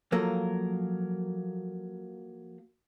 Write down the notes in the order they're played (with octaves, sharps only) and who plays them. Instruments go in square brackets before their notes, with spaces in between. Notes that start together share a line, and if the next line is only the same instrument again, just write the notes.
[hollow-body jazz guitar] F3 F#3 A#3 A4 A#4